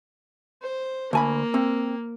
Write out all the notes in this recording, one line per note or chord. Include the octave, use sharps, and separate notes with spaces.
C5
D2 A#3 G#5 B5
C4